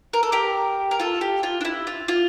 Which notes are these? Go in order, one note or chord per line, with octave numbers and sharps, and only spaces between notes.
A#4
A4
G4 A#4
A#4
F4 A4
G4
F4
D4
E4
F4
F4